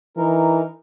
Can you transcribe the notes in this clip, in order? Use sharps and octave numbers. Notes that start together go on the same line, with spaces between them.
E3 D#4 A#4